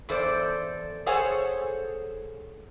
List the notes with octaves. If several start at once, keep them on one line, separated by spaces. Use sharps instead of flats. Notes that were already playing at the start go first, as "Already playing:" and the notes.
E2 A4 C5 D5
G#4 A4 C5 C#5 F#5 G#5